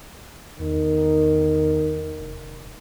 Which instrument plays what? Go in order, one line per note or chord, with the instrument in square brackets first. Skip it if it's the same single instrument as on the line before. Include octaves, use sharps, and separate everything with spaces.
[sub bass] E2 [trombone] D#3
[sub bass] F1